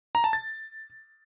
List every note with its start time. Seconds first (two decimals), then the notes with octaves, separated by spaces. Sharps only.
0.15 A#5
0.24 A5
0.33 A6